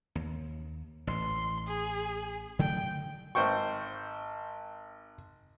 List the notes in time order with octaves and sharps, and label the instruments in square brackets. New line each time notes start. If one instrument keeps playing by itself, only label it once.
[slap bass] D#2
[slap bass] A1 A2 [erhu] C6
[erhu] G#4
[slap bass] D3 F#3 A3 [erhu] G5
[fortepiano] G#1 C5 G5 C#6